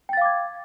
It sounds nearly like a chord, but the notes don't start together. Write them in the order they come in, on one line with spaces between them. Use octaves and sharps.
G5 A6 F5 D6 G#6